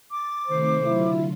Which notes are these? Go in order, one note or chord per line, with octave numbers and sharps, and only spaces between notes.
D6 A6
C3 D#3 A3 C5
D3 F#3 E4 F4